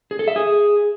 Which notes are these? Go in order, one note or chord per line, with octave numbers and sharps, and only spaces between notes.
G#4
A4
E5
G#4